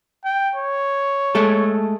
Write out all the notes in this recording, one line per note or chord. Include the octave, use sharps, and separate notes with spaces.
G5
C#5
G#3 A3 A4